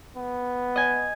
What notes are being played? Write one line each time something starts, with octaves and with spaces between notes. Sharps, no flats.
B3
D#5 G#5